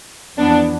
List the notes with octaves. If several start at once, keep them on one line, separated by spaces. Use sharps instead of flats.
F2 E3 B3 D4